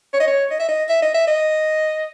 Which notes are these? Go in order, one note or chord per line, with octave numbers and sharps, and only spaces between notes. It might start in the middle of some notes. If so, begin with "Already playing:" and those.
C#5
D#5
C#5
D#5
E5
D#5
E5
D#5
E5
D#5